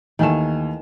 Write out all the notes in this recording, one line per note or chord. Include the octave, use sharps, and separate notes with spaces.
D#2 D#3 E3 A3 G#5 E7